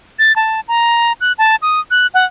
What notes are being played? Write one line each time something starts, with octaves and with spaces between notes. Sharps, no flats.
A6
A5
A#5
F#6
A5
D#6
F#6
F#5